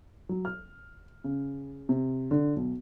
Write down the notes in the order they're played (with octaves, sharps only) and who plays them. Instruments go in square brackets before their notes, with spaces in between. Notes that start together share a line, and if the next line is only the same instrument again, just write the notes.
[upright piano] F#3
F6
C#3
C3
D3
B1